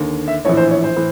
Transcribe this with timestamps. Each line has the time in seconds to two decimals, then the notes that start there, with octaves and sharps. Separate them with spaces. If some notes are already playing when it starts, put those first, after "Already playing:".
Already playing: D#2 D3
0.28 E5
0.45 A#1 A2 E3 C#5
0.57 C5
0.71 C#5
0.84 C5
0.96 A2 E3